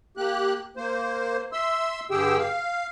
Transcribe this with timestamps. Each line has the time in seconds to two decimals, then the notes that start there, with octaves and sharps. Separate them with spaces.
0.17 A#3 G4 F#6
0.77 A#3 C5
1.53 E5 C6 E6
2.11 G2 D3 G4 G#4 G5 E6
2.39 F5